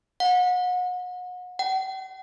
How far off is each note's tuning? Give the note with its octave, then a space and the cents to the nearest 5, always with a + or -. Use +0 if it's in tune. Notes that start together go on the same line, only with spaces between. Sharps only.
F#5 -35
F#5 +45